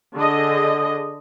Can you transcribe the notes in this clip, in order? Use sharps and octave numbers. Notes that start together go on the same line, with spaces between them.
D3 G#4 D#5